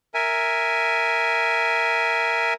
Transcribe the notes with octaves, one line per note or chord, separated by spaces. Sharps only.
A#4 E5 G#5